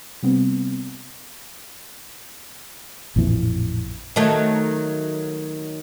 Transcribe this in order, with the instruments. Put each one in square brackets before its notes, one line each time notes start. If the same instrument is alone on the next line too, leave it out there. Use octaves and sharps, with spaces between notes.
[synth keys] C3 G3 B3 C4
[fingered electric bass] A1 F2 A#2 E3
[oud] D#3 F#3 A3